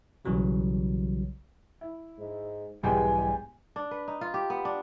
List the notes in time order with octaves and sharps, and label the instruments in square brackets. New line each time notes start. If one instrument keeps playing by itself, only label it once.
[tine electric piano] B1 C#3 E3 F#3 G3
[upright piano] E4
[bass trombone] G#2
[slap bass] B1 G#2 G3 [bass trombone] E2 [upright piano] G#3 B3 G4 [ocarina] G#5
[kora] D4
B4
D#4
F4
G4
B3
D4